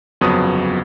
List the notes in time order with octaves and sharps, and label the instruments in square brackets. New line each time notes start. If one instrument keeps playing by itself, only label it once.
[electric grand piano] G1 F2 C#3 F#3 B3 D#6